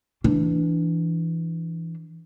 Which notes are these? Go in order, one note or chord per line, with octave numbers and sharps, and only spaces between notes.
E3 D4